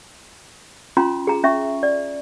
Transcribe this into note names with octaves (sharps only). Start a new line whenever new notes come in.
C#4 F4 A#5 C6
G#4 A#5
C#4 E5 C#6
D5